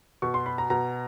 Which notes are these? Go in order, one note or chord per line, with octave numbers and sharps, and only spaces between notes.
B2 C#6
C6
B5
A#5
B2 A#5